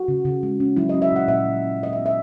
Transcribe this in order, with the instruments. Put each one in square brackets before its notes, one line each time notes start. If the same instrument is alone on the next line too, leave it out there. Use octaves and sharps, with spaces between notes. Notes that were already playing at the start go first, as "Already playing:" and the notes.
Already playing: [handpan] F#4
C#3
C#3
G#3
C#4
F#3 E4
C#4 D#5
E5
A#2 F#5
A#2 E5
F#3
C#4
G#3 D#5
B3 E5
E5